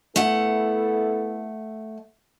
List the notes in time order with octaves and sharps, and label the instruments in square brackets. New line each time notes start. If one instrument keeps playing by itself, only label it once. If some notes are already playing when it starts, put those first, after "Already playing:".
[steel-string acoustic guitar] A3 F#5 [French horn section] B3 E4 A4